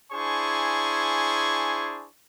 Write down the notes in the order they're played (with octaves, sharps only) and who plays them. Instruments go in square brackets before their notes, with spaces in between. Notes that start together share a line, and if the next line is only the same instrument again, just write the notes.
[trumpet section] D4 E4 G#4 C5 G#5 C#6